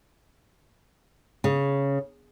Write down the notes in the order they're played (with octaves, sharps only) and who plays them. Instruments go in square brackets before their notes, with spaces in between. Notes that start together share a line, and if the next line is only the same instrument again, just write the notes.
[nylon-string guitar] C#3